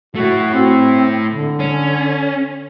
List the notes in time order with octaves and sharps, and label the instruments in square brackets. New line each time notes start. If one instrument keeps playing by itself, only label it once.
[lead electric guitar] A3 E4 [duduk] F#4
[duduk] C4
D3
[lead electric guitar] C#4